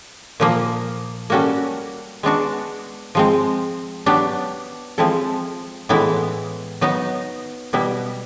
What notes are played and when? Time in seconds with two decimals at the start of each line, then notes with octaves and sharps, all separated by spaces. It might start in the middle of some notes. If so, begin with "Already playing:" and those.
0.40 A#2 F3 A#3
1.30 G3 A#3 C#4 F#4 A4
2.23 G#3 B3 D4 F#4
3.15 F3 G#3 C4
4.06 F#3 B3 D4 G4
4.98 F3 G#3 C4 E4 A4
5.89 A2 E3 G#3 B3 E4
6.81 F#3 B3 D#4
7.73 B2 G3 B3 E4